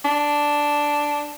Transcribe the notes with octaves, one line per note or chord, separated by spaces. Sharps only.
D4